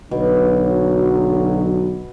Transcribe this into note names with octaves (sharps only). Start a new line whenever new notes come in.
B1 B2 D3 F#3